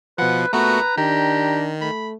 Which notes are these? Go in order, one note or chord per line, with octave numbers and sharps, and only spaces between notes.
B2 F3 B4 F#5
A#2 A3 B3 F#4 B4 A#5
D#3 D4 G4 A#5
A3 B5